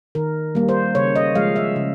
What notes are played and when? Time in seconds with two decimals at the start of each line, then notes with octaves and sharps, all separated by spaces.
0.15 D#3 A#4
0.55 G3 A#3
0.69 C5
0.95 C#3 C#5
1.16 D#5
1.35 F3 G#3 F5
1.56 E5
1.76 C#3